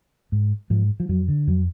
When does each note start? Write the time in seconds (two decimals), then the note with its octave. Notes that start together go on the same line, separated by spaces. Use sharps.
0.32 G#2
0.70 G#2 F3
1.00 F3
1.09 F2 F#3
1.28 D3
1.47 F2 F#3